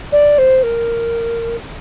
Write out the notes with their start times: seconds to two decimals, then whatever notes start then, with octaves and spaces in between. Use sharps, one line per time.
0.12 D5
0.38 C5
0.63 A#4